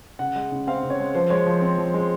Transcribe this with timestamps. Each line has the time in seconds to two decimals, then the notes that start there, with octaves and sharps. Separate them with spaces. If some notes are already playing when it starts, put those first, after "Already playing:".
0.19 C#3 F#5
0.36 G#3
0.52 C#3
0.67 C4 F5
0.83 C#3
0.90 C#5
0.99 G#3
1.15 F3 C5
1.30 G#3 C#5
1.46 F3
1.61 C4
1.78 F3
1.94 G#3